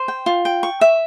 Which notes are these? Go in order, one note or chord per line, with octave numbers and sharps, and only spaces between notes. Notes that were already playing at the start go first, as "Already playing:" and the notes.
Already playing: C5
G5
F4
G5
C#6
E5